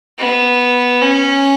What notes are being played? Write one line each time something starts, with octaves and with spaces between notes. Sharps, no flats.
B3
C#4